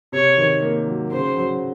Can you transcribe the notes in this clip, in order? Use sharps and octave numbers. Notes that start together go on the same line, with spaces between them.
C3 C#5
D#3
A#3
F#3
C#3 C5
F#3